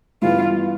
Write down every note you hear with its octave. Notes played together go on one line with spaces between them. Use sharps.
G2 E3 B3 F4